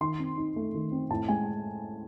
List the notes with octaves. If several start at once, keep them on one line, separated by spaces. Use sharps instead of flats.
D#3 C6
C4
D#4
A3
D#3
C4
A2 A5
G#3 G#5